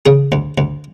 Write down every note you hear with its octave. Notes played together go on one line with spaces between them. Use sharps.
C#3 G#4
D2
D2